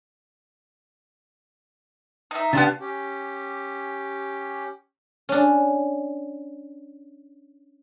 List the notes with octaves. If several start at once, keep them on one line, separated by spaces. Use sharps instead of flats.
D#4 E5
C#3 B3 D4 F4 G4 A5
C#4 G4
C#4 D4